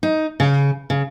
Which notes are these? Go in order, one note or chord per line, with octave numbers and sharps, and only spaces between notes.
D#4
C#3
C#3